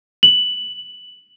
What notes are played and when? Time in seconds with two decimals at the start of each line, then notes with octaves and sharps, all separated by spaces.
0.23 F#7